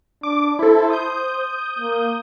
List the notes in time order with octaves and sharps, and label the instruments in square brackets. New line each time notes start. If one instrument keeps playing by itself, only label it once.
[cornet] D4 [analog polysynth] D6
[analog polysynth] E4 A4 [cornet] C5
[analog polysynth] D#6 G6
[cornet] A#3